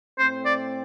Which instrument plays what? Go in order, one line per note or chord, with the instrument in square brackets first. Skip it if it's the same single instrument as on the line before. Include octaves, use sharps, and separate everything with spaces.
[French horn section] A2 A3 C4 [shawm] C5
[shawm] D5